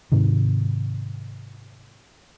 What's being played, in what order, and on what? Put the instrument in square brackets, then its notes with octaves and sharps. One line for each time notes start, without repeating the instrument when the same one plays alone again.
[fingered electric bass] G#2 C3 D#3